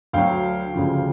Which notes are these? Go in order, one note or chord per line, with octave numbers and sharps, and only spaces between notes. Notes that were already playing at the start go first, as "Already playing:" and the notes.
D2 D3 F#3 F5 G5
D2 C#3 F3